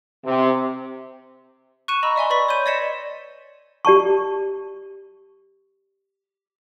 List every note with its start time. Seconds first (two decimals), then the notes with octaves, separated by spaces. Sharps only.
0.24 C3
1.88 C#6 F#6 C#7 D#7 E7
2.03 D#5 A#5 B5 C#6 E6
2.16 D5 E5 G#5 C6
2.30 B4 D5 B5 C#6 B6
2.49 C#5 C6 G6 D#7
2.66 D5 D#5 G#6 B6 C#7 E7
3.85 G4 D5 A5 C#6